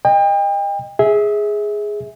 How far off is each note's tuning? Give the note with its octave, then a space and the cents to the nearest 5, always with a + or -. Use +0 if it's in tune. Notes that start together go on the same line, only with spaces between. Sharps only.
D#5 -15 G5 +35
G#4 +0 E5 -25